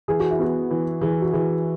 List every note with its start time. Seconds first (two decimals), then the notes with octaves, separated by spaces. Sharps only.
0.08 E3 G#4
0.20 F#4
0.31 E4
0.39 B3 F#4
0.71 E3
1.01 E3 G#4
1.22 F#4
1.32 E3 G#4